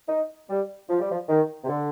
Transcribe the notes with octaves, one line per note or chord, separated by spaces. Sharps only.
D#4
G3
F3
G3
F3
D#3
C3
D3